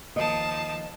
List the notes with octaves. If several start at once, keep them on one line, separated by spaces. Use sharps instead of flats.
D#2 F3 D#5 A5 D#6